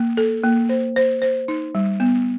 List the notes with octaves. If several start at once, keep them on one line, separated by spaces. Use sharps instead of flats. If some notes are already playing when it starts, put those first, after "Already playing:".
Already playing: A#3
A4
A#3
C5
C5
C5
D#4
G3
B3